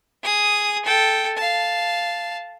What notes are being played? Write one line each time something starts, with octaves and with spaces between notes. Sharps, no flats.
G#4 D#6
A4 G5
F5 A5